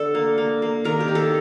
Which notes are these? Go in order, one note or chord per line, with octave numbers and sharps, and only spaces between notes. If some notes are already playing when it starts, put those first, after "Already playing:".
Already playing: D3 D4 A4
A#3
A#3
A#3
D#3 A#4
G4
D#3
A4